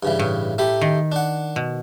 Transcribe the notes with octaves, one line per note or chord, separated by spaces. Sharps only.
G2 C#3 E3
A2
A3 G4 B5
D#3
D4 F#5
B2